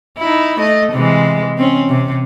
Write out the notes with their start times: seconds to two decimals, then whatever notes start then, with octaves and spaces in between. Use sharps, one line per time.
0.18 D#4 E4
0.59 A3 D#5
0.92 C3 E3 G#3
1.58 C4 C#4
1.89 C3